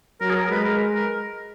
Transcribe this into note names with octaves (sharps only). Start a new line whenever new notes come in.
F#3 A#4
G#4
A#4
G#3 B4
A#4
A#4